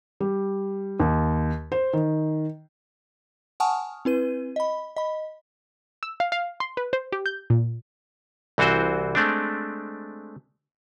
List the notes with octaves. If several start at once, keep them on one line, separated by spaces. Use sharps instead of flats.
G3
D#2
C5
D#3
F#5 G#5 A5 C#6 D#6 F6
C4 E4 B4 D#7
D#5 B5
D#5 B5
E6
F5
F5
C6
B4
C5
G4
G6
A#2
C2 E3 C4 F#4 C5
G#3 A3 C4 D4